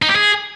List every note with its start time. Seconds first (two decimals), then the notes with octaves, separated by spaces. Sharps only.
0.02 D#4
0.09 G4
0.15 G#4